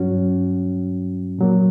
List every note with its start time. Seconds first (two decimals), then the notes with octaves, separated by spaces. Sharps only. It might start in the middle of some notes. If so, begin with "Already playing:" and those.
Already playing: G2 F#3 C#4 F#4
1.39 A#2 F#3 A#3